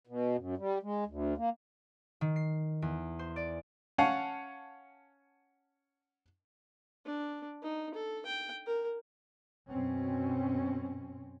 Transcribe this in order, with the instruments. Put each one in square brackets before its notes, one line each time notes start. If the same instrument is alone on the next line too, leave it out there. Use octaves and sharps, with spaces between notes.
[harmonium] B2
F#2
G3
G#3
D2
A#3
[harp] D#3
C7
E2
C5
D5
[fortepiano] C#4 F5 F#5 A5
[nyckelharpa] D4
D#4
A4
G5
A#4
[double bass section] F#2 B2 C4 C#4